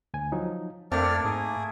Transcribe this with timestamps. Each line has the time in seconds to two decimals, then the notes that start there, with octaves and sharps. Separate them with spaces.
0.14 D2 G#5
0.32 F3 F#3 D#4
0.92 F2 A3 A#3 C4 D4 D5 F6
1.24 G#2 G#4